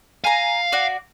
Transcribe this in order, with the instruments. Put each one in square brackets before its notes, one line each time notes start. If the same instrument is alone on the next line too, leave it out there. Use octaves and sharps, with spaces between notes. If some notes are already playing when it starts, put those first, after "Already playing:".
[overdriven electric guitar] F5 [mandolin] G#5 A#5
[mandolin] F#4 D5